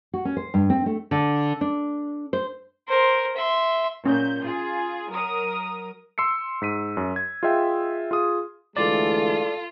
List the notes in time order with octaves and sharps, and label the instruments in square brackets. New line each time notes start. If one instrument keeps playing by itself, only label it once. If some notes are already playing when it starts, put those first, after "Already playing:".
[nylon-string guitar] F#4
C#4
C5
G2
C4
A3
D3
D4
C5
[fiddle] A#4 C5
E5 C6
[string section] A#2 G6 [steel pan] C#4
[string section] F4 G#4
F#3 A#4 D#6
[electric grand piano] C6 E6 C7 C#7
G#2 B6 D#7
F#2
G#6
F4 G#4 D#5 E5 G5
F4 G#4 D#6
[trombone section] D2 E3 G#3 [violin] F4 [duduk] A4 [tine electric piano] D5